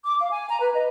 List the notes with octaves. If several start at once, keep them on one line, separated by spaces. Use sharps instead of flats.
D6
F5
G#5
A#5
B4
D#5